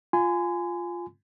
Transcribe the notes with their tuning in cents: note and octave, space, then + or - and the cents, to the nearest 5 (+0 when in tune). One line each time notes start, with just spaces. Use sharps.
F4 +0 G#5 +0 C6 -40